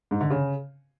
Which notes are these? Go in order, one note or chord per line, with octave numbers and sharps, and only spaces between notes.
G#2
D3
C#3